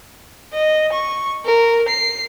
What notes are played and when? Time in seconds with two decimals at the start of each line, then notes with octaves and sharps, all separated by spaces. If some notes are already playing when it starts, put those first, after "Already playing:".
0.54 D#5
0.93 C#6
1.46 A#4
1.89 C7